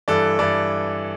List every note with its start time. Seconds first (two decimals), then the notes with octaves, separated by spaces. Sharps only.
0.08 G2 E3 A4 D5
0.39 G2 E3 A4 D5